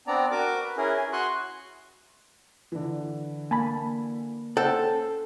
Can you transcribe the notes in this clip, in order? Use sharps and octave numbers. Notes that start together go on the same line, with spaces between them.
B3 C4 D4 D5 A#5
F#4 A#4 D6
B4
C#4 E4 G#4 A#4
G#5
F#4 C6 C#6 D#6 F#6
D3 E3
A#3 G#5 A5 B5
C#4 A4 C5 F#5 G5 G6